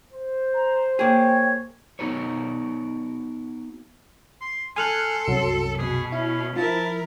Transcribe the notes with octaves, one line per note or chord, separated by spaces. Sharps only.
C5
A#5
A#3 G#4 C#5 G5
B3 D#4 F#4 A#4 B4 C#5
C6
A4 G#5 C6 F6 F#6
C2 F#2 F#3
B2 G#4
C#4 E4
F3 E4 A#4 A5